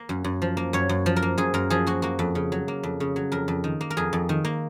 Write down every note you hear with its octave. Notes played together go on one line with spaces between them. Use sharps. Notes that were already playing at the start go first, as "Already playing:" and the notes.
Already playing: A#3
F#2
F#2
F3
A#3
F#2 C#5
F#2
F3
A#4
A#3
F#2 G#4
F#2 A#4
F3 G#4
A#3 F#4
A#3 F#4
F2
C#3
F#3
A#3
F2
C#3
F#3
F2 A#4
F2
D#3
A#3
A#4
F2 G#4
F2
D#3
A#3